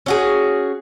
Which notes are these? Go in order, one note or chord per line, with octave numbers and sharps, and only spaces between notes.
C#4 F#4 G#4